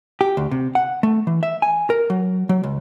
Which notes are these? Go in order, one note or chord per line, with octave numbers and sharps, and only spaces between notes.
G4
D2
C3
F#5
A3
E3
E5
G#5
A#4
F#3
F#3
C#2